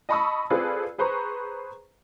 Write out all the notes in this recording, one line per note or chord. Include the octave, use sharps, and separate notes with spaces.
D#5 A5 B5 C#6 D#6 E6
C4 F4 G#4 A4 B4 D5
G#4 B4 C5 A#5 C#6